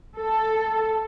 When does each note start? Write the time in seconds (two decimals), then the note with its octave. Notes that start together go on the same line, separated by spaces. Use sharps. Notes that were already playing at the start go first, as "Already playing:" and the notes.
0.17 A4